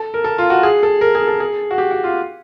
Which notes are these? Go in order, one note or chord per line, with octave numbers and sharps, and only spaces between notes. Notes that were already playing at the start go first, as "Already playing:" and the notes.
Already playing: A4
A#4
A4
F4
F#4
G#4
A4
A#4
G#4
A4
G#4
F#4
G4
F#4
F4